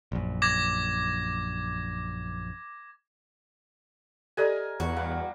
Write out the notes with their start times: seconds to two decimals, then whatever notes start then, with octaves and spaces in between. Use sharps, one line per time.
0.12 A#1 F#2
0.42 D6 G#6 A#6
4.37 G4 A4 A#4 D5 D#5 G#5
4.80 E2 F#4
4.96 G3 F5 F#5